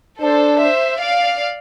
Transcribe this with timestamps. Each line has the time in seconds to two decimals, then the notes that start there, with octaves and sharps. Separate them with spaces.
0.21 D4 A4 C5
0.60 C5 E5
1.00 D5 F5